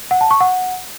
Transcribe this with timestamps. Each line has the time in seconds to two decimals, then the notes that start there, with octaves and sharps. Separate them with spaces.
0.11 F#5
0.21 A5
0.31 C#6
0.40 F#5